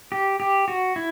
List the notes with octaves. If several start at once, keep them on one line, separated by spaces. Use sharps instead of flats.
G4
G4
F#4
E4